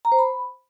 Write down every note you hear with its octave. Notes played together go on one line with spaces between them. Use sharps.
A#5
C5
B5